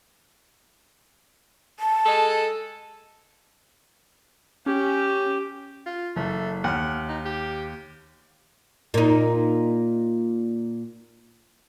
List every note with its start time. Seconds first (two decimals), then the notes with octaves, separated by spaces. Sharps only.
1.80 A5
2.06 G#3 A4 D#5
4.66 C#4 G4
5.86 F4
6.16 F#1 A3
6.64 D#2 F#5 F6
7.09 D#4
7.25 G4
8.94 A#2 D#4